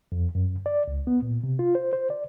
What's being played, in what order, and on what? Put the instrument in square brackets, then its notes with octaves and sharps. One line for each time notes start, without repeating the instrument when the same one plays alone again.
[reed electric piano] F2
F#2
D5
C#2
B3
A#2
C3
F4
C5
C5
D5